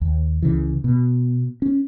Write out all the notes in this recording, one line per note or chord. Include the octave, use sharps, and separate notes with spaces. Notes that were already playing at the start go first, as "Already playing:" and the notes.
D#2
C#2 C#3 E3
B2
C#4